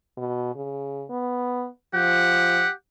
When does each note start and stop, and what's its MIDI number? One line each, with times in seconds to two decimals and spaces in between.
0.17 0.55 47
0.55 1.04 49
1.10 1.68 59
1.94 2.64 53
1.94 2.72 67
1.94 2.72 78